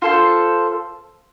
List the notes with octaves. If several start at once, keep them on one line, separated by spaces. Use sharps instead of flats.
F4 A4 C5